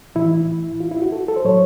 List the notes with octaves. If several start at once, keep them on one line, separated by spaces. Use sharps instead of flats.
A2 E3 E4
F4
E4
F#4
A4
A4
C5
A2 F#3 C#5